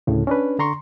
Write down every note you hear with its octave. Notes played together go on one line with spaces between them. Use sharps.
D2 A2 C#3
C#4 D4 B4
D3 A#5 C6 C#6